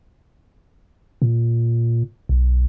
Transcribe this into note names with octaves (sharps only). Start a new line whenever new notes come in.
A#2
B1